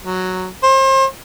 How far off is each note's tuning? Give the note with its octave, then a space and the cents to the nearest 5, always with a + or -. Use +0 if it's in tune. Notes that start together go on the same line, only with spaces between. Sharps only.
F#3 +0
C5 +35